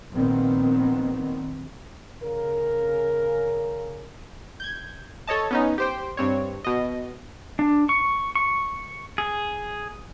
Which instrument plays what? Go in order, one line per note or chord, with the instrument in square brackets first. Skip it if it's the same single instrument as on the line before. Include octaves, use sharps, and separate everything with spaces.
[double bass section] A#1 A#2 D#3 B3 C4
[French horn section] C#3 A#4
[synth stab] G6 G#6
A4 C#5 D#5 A5
B3 C#4 D#4
G4 C5 G5
G2 C4 C#5
B2 D#5
[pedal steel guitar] D4
C#6
C#6
G#4